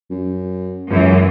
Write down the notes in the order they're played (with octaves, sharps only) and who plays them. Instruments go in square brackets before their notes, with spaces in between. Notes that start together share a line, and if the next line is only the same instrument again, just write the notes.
[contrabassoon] F#2
[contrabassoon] C#2 [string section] F#2 E3